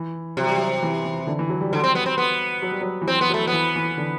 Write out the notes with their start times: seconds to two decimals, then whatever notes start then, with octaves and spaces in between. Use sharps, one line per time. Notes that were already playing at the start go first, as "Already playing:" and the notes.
Already playing: E3
0.37 C3 F#3
0.46 G3
0.56 F#3
0.82 E3
1.04 E3
1.27 D3
1.39 E3
1.49 F#3
1.61 G3
1.71 D3 F#3
1.80 G3 C4
1.95 B3
2.06 C4
2.18 B3
2.62 F#3
2.72 G3
2.81 F#3
3.01 E3
3.07 F#3 C4
3.21 B3
3.30 F#3 A3
3.47 E3 B3
3.76 E3
3.97 D3